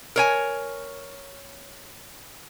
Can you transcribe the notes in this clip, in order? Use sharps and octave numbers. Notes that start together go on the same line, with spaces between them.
A#4 C#5 G#5